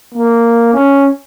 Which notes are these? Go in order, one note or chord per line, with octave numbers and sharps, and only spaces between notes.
A#3
C#4